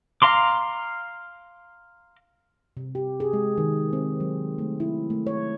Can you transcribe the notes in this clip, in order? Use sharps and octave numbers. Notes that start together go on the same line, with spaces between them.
F5 A#5 C6 D6
C3
G4
G#4
G#3
D#3
C4
F#3
A3
E4
A3
C#5